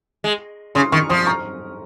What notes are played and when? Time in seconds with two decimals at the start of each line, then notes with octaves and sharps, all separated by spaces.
0.24 G#3
0.75 C#3 C6 D#6
0.92 D#3 C#6 F6
1.09 F3 C6 D#6
1.26 A#5 C#6